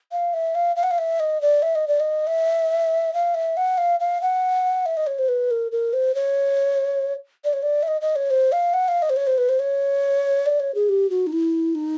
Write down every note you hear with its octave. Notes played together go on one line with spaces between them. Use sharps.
F5
E5
F5
F5
F#5
F5
E5
D#5
D5
E5
D#5
D5
D#5
E5
F5
E5
F#5
F5
F5
F#5
E5
D#5
C#5
C5
B4
A#4
A#4
C5
C#5
D5
C#5
D5
E5
D#5
D#5
C#5
C5
F5
F#5
F5
D#5
C5
C#5
C5
B4
C5
C#5
D5
C#5
G#4
G4
F#4
D#4
E4
D#4